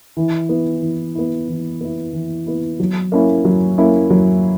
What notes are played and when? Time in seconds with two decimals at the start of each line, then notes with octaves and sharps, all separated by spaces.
0.17 E3
0.49 B3 E4
0.82 E3
1.15 B3 E4
1.48 E3
1.81 B3 E4
2.13 E3
2.47 B3 E4
2.80 F#3
3.12 A#3 C#4 E4
3.45 F#3
3.78 A#3 C#4 E4
4.10 F#3